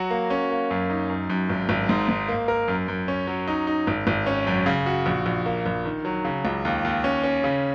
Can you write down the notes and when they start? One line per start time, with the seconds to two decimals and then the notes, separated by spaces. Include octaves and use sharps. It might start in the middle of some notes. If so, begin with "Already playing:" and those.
Already playing: F#3 F#4
0.10 A#3
0.30 C#4
0.50 A#3
0.71 F#2
0.90 D#4
1.10 F#2
1.30 F#2
1.49 G#1
1.69 G#1
1.89 G#2
2.09 G#2
2.28 A#3
2.48 A#4
2.68 F#2
2.88 F#2
3.08 C#4
3.27 F#3
3.47 D#4
3.67 D#4
3.87 G#1
4.07 G#1
4.26 C#4
4.47 F#2
4.66 C#3
4.86 F#4
5.06 A#1
5.26 A#1
5.46 A#3
5.66 A#1
5.85 D#3
6.05 F#3
6.25 C#3
6.45 C#2
6.65 D#2
6.85 D#2
7.04 C#4
7.23 C#4
7.44 C#3